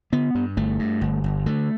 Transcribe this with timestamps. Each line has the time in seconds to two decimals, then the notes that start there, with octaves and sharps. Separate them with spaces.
0.12 D3 B3
0.35 G2
0.57 G1 A3
0.79 G2
1.01 G1
1.24 G1
1.46 D3 A3